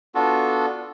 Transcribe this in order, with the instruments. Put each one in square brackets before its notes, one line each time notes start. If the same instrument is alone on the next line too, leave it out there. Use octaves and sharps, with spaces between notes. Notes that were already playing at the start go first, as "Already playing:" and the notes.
[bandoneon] B3 D4 F4 F#4 A4